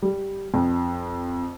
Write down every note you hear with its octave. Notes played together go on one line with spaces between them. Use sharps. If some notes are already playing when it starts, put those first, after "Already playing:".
G3
F2